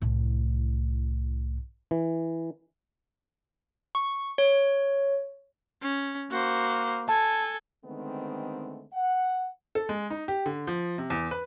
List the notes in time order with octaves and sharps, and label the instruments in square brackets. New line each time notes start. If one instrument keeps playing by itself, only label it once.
[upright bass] C2 A2
[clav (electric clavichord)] E3
[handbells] C#6
C#5
[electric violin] C#4
[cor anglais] A#3 [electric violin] F#4 C5
[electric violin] A4 G#5 [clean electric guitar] A5
[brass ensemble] D3 D#3 G#3 A3 B3 C4
F#5
[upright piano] A4
G#3
D#4
G4
D3
F3
C3
E2
B4